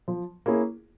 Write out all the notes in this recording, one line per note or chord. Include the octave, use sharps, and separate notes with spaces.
F3
A#3 C#4 E4 G#4